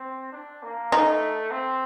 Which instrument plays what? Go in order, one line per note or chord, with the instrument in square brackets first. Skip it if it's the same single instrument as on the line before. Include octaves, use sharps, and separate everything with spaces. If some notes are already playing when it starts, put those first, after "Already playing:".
Already playing: [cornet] C4
D4
A#3
[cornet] A3 [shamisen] D#4
[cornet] C4